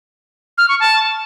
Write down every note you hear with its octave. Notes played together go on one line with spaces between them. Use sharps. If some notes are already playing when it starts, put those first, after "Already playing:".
F6
C#6
A5